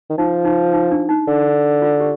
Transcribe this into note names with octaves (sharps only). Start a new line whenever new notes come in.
D#3
F3 D#4
D#4
D#4
D4
D#4
D3
F4
G4